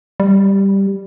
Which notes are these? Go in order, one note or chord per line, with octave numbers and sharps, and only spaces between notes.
G3